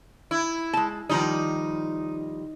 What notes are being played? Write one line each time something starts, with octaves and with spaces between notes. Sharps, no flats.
E4
G#3 A5
D#3 F3 G3 D#4